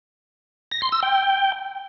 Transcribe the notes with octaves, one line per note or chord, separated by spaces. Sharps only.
A#6
C6
E6
G5